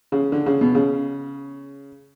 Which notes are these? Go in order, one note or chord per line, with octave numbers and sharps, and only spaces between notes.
C#3
D3
C#3
B2
C#3